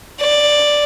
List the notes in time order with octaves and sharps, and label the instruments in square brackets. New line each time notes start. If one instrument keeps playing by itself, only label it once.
[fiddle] D5